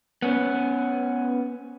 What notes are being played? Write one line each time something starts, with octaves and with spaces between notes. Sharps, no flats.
B3 C#4